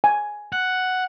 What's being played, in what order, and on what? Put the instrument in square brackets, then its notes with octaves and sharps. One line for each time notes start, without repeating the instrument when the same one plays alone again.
[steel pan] G#5
[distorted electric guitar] F#5